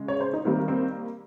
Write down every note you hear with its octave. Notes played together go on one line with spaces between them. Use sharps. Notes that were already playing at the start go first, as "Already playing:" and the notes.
Already playing: C#3 G#3
C#5
C5
D#4
D#3 G3 A#3 C4
C4